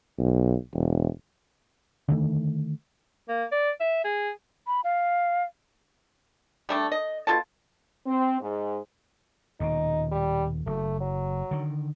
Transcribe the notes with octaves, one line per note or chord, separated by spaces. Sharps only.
B1
E1
D3 D#3 A3
A#3
D5
E5
G#4
B5
F5
G3 A3 D4
D#5
B2 F4 A4 A5
C4
G#2
D#1 D#2 B2 D#4
G3
F#1 A3
F#3
D3 D#3